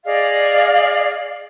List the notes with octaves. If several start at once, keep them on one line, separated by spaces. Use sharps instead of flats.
G#4 D5 D#5 F5